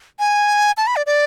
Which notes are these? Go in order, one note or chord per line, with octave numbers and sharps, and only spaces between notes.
G#5
A5
B5
D5
D5